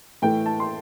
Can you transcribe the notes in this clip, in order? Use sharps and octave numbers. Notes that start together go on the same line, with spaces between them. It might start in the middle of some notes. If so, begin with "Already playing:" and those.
A2 E3 A3 G5
A5
C6